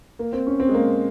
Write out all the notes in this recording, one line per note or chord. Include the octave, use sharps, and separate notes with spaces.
A#3
C4
C#4
C4
G#3
A#3